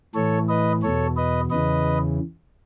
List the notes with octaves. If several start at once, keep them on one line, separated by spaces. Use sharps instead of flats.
A2 E3 A4 C#5
B4 D#5
E2 B2 A4 C#5
B4 D#5
E2 C#3 E3 B4 D#5